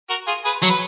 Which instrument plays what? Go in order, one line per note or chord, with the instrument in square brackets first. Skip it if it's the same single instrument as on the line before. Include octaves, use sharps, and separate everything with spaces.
[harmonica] F#4 A#4
F4 G#4
G#4 B4
[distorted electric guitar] F#3 [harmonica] C#5
[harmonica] B4